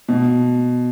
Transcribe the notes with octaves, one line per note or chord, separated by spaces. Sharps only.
B2